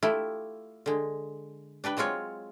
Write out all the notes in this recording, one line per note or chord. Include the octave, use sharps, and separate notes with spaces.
A3 E4 F4 G4
D3 G#3
D4 G4 B4 G5
F#3 G#3 C4 F4 C#5